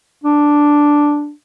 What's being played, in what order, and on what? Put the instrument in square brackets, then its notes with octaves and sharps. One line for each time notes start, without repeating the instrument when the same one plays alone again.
[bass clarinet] D4